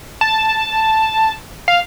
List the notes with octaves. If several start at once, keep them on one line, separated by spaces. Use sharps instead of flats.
A5
F5